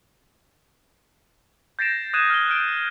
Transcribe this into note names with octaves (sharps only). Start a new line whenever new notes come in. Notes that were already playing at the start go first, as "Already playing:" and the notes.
G6 A6 A#6 C7 D7 E7
D#6 F#6 G#6 D#7 E7
F6 G#6 G7
F6 G6 D7